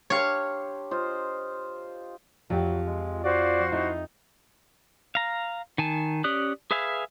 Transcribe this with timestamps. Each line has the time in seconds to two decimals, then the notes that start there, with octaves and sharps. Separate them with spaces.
0.10 D4 G4 C#5 F5 C6
0.91 F4 C5 D#5
2.50 F2 F3 F#3 G4
2.86 G#3
3.24 F#4 C5 D5 F5
3.72 D#4 E4 A4
5.15 F5 A#5
5.78 D#3 G#5 A5
6.24 C#4 G4 D5 D#6 F#6
6.71 G#4 B4 E5 F5 G#5